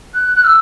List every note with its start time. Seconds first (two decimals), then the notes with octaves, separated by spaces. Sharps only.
0.14 F#6
0.35 F#6
0.44 E6